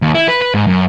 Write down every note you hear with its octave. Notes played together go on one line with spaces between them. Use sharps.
D#2
E4
B4
B4
G#2
F#2